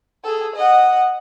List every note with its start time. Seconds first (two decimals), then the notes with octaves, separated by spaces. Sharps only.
0.24 G#4 A4
0.56 D#5 F#5